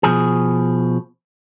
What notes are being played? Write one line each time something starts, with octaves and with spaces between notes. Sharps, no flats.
B2 F3 G#4